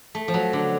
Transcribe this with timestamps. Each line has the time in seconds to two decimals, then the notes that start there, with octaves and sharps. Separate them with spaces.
0.15 A3
0.28 F3
0.34 F#3
0.53 D3